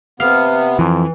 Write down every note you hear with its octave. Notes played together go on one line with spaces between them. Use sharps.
C3 B3 F5
F2 E3